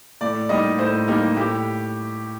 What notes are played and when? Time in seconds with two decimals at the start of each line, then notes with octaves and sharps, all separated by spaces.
0.21 A2 D5
0.49 G3 A#3 D#4 G4 D#5
0.78 A2 C5
1.08 G3 A#3 D#4 G4
1.37 A2 G4